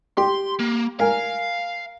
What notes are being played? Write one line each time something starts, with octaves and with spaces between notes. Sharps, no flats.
G4 C6
A#3
A#4 F5 G#5